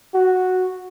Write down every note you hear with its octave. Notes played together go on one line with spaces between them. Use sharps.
F#4